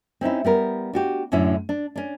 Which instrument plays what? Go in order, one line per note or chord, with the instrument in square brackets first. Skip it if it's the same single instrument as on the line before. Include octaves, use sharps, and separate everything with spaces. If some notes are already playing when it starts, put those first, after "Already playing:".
[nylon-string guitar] C4 C#4 D#4 E4
G3 B3 A#4
D4 F#4 G4
F#2 A2 D3 C#4 E4
D4
C#4 D4